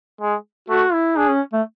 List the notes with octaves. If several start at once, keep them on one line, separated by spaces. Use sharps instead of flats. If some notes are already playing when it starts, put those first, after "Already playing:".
G#3
A3 F#4
E4
D4 G#4
C#4
A3